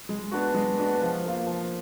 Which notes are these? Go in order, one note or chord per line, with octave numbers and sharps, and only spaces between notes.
G#3
B3 D4 F#4
G#3
B3 D4 F#4
F3
A#3 F4
F3